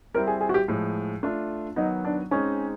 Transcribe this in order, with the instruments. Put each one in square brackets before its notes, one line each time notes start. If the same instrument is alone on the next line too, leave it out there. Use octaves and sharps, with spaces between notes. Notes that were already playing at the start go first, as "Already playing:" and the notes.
[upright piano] G3 C4 E4 [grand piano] A#4
[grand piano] G#4
G#4
F#4
G4
[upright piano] A2 F3 G#3
A3 D4 F4
[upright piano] D#3 F#3 B3 [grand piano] D#4
[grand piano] D4
[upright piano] G#3 C4 D#4 [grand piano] C#4